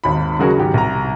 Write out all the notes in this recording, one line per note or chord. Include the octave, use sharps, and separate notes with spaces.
G#1 D#2 B5
C#3 F#3 D#4 F#4 G#4 A#4
G#2 D#3 G4
C2 A#5